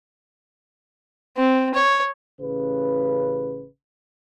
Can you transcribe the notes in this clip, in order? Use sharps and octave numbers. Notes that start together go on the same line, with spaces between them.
C4
C#5
A1 C#3 B4